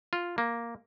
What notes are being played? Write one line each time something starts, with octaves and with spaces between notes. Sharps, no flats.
F4
A#3